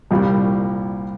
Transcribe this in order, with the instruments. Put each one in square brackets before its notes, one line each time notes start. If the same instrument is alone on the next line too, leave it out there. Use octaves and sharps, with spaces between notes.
[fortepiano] C2 A#2 G3